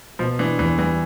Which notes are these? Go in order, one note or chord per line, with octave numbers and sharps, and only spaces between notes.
B2 F3
E3 D4
E2 E3
E3 G3